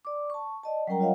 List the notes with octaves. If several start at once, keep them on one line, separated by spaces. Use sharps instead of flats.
D5 D6
A5 C#6
D5 D#5 A5
F#3 G3 C#4 A#4 G5 A#5
F4 C#5 D#5 F5 F#5